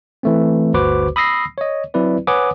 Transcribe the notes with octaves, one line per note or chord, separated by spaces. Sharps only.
E3 A3 C4
G1 D2 F#4 B4 C5 D6
B5 D#6 E6 A#6 C7
C#5 D#5
F#3 C4 E4 B4 D5
B4 C#5 F#5 G#5 D6 D#6